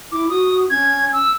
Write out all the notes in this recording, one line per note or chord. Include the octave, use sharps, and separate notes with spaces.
E4 D6
F#4 D#6
C#4 G#6
E6